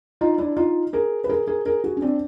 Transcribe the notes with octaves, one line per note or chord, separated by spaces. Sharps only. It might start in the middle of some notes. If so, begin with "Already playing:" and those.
D#4 F4
D4 E4
D#4 F4
G#4 A#4
B4
G#4 A#4
G#4 A#4
G#4 A#4
F#4 G#4
C#4
C4 D4